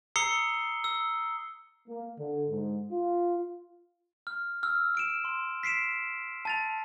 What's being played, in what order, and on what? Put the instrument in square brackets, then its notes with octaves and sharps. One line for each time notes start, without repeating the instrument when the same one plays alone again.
[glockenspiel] A#5 D#6 E6 C7 C#7 G7
E6
[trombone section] A#3
D3
G#2
F4
[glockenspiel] F6
E6 F6
F6 D7 E7
C6
B6 C7 D7 E7
A5 A6 F7